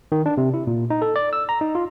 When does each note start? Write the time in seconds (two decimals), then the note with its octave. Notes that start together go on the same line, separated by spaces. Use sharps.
0.12 D#3
0.26 D4
0.37 C3
0.54 E4
0.67 A#2
0.90 D#4
1.02 A4
1.16 D5
1.33 E6
1.49 A#5
1.61 D#4
1.75 F4